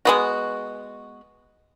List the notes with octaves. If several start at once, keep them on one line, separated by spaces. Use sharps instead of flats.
G#3 B3 F#4